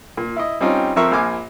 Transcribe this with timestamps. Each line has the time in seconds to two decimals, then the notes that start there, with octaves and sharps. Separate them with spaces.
0.17 A#2
0.36 E4 D#5
0.61 G3 C4 C#4 D#4 F4
0.96 F2 F3 C4 A#4 E5 C#6
1.12 A#1 A#2 G#5 D6 F6